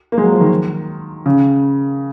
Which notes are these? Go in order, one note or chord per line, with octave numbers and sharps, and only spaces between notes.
A#3
G#3
F#3
F3
D#3
C#3